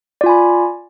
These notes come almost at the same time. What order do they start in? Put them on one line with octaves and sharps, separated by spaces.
D5 F4 G#5 B5